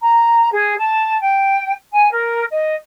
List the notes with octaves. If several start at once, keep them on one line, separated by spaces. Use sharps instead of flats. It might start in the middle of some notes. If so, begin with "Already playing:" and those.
A#5
G#4
A5
G5
G#5
A#4
D#5